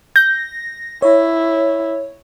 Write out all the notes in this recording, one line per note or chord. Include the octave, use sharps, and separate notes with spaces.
G6 A#6
E4 C#5